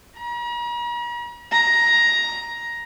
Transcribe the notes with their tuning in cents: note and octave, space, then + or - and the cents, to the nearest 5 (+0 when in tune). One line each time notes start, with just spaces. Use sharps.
A#5 +45
A#5 +10